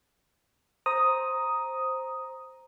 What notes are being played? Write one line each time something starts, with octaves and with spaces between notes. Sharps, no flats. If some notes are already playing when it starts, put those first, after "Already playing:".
C5 A#5 D#6